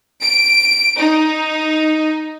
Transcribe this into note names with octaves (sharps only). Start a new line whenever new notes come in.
D7
D#4